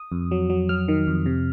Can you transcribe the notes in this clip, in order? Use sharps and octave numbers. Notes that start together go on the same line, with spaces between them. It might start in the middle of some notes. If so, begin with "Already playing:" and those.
Already playing: D#6
F2
F#3
F#3
F#3 F6
D#3
F2
C3